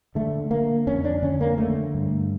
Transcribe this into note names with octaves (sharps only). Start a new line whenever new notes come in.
D3 A3
D3 A#3
F2 C#4
D4
D3 C#4
A#3
D3 A3
G2